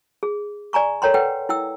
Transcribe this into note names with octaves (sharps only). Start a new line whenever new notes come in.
G#4
D5 G#5 A#5 C#6
A4 A#4 C#5 G5 A#5 C6
A4 B4 F#5 G5
E4 G5 E6